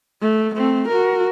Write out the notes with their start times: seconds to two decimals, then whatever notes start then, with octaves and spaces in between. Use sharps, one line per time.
0.22 A3
0.55 A3 C4
0.88 F#4 A#4